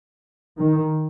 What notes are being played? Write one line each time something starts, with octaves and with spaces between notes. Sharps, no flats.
D#3